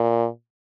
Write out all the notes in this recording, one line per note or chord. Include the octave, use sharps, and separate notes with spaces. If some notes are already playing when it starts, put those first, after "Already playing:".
Already playing: A#2